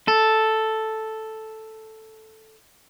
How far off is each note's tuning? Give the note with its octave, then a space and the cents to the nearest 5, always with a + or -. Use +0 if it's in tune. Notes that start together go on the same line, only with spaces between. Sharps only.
A4 +0